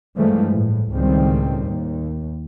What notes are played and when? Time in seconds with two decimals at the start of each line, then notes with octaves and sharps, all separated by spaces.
0.17 G2 E3 F3 G#3 A3
0.52 A2
0.90 C#2 A2 D#3 G3 C4
1.65 D#2